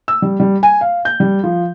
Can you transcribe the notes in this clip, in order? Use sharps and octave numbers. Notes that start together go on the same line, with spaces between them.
E6
G3
G3
G#5
F5
G6
G3
F3